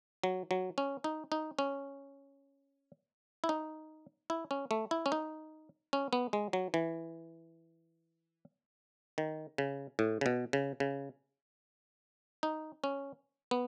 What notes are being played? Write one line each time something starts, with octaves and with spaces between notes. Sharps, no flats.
F#3
F#3
C#4
D#4
D#4
C#4
E4
D#4
E4
C#4
A3
E4
C#4
D#4
C#4
B3
G#3
F#3
E3
D#3
C#3
A2
C#3
B2
C#3
C#3
D#4
C#4
B3